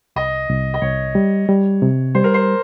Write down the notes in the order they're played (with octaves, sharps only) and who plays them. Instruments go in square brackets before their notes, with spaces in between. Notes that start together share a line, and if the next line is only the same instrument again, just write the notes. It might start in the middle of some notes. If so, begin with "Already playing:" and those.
[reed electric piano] C2 [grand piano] D#5
[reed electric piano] C2
[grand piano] D#5
[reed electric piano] C2 [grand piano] C#5
[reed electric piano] G3
G3
C3
[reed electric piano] G3 [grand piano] C5
[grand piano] A#4
C5